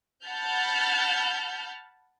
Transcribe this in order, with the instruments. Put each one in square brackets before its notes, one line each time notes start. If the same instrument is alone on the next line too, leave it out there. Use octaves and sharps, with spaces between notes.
[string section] F#5 A5 B5 F6 G6